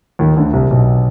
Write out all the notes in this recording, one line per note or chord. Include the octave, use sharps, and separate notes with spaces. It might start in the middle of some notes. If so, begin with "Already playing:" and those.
D#2 D#3
D2 D3
C2 C3
B1 B2